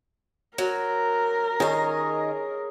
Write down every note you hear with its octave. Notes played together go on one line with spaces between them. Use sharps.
F#3 A#4
D#3 G#4 C#5 D#5